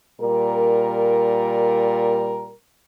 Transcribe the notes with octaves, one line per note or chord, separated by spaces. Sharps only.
A#2 G3 A#4